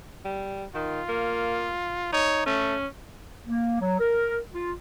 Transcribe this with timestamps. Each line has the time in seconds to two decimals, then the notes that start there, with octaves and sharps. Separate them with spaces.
0.25 G3
0.75 D#3 F4
1.09 A#3
2.12 D#4 C#5
2.46 A3 C#4
3.46 A#3
3.80 F#3
4.00 A#4
4.53 F4